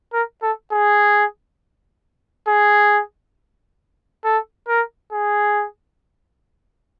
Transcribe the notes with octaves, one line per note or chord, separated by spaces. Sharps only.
A#4
A4
G#4
G#4
A4
A#4
G#4